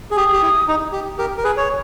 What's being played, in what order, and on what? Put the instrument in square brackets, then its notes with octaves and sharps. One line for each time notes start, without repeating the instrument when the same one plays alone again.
[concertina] G#4
[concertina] G4 [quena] D#6
[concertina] G4
E4
D#4
G4
G4 A#4
A#4
G#4 B4
C#5